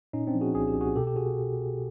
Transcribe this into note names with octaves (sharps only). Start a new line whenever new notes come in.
A#2 C#4 D#4
C4 D4
F3
F#4 G#4
C2 G#4
G4
C2
F#4 G#4
B2 G4 A4
G4
F#4 G#4